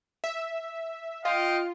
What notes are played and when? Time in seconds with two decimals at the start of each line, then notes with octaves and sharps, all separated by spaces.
0.24 E5
1.25 F4 D#5 F5 G5